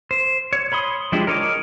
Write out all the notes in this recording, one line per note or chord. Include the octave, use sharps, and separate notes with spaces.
C5
C#5
C#5 B5 C6 D#6
F3 G#3 D4 E4 G4
A#4 C#5 D#5 D6